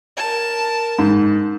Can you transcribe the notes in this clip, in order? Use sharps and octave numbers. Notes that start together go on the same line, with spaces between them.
A#4 A5
G#2